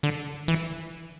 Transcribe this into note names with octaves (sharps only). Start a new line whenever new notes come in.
D3
E3